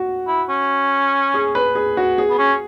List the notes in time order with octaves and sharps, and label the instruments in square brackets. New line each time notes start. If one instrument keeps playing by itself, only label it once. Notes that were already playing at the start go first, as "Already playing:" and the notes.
Already playing: [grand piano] F#4
[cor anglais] E4
C#4
[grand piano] G#4
B4
G#4
F#4
G#4
[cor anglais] B3
C#4